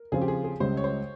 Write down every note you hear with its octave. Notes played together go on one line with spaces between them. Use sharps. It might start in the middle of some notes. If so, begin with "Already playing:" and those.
Already playing: A#4
C#3 F3 C4 F4 G#4
G4
G#4
G#4
C#2 C#3 G3 C5
C#5
C5